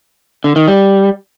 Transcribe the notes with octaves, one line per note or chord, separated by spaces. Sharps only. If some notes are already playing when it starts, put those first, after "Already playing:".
D3
D#3
G3